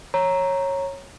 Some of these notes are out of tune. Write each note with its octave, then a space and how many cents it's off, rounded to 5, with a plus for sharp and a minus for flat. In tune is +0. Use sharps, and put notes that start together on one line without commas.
C#5 -10 A#5 +0